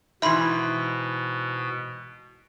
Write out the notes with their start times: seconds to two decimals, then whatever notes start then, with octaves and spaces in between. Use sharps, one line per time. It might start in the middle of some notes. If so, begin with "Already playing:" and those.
0.22 G#2 B2 E3 E5 B5 C6